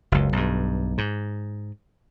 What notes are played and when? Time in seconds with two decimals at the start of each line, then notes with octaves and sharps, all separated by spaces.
0.12 F#1 C#2
0.33 B1 G2
0.98 G#2